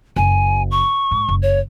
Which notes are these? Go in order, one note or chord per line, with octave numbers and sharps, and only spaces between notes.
F#1 G#5
C#6
G#2
F#1
C#5